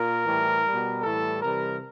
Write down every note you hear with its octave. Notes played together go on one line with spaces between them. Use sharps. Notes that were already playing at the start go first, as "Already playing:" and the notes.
Already playing: A#2 A#4
A2 E3 G3
B2 G3
A2 E3 G3 A4
C3 E3 G3 A#4